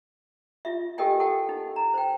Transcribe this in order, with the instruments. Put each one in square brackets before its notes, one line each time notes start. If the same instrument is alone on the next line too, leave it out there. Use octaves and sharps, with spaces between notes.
[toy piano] F4 E5
G4 A4 A#4 D#5 G5 G#5
A4 F#5 G5 A5
D#4
A#5
C5 G5